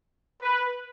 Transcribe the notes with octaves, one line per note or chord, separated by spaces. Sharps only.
B4